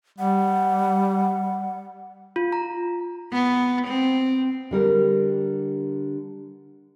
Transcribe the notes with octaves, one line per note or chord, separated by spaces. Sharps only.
G3 F#5
F4
A#5
B3
C4
D3 G3 A#4